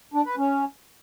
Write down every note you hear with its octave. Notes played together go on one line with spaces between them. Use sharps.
D4
B4
C#4